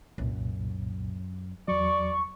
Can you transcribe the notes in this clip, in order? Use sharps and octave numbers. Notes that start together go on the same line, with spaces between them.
C2 F#2 A#2
E2 F#3 D5 C#6